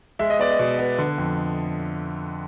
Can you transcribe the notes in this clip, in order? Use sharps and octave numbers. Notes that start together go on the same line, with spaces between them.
G#3 E5
D#5
B3 D5
D#5
B2
B3
D3
F2